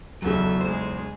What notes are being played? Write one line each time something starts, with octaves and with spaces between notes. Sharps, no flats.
B1 E2 C#3 F#3 A4 E5
G#3 G#4 C5